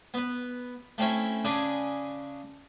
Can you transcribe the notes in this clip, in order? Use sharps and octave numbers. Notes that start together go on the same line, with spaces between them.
B3 B4
A3 C4 C#4 E4
C#3 D4 G#4 G#5 B5